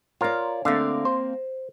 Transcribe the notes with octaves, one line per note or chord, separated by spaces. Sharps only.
F4 A#4 C#5 D5
D3 A3 A#3 C4 F5
C5